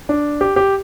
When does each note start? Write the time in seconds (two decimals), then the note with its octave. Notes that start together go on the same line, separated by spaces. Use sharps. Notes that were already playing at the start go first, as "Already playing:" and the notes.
0.09 D4
0.41 G4
0.56 G4